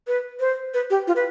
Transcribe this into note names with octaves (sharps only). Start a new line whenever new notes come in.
B4
C5
B4
G4
F4
B4